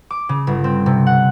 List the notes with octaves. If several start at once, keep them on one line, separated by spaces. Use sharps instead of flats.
D6
C#3
G1
C4
C3
F#5